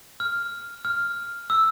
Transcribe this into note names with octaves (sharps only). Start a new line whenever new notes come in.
F6
F6
E6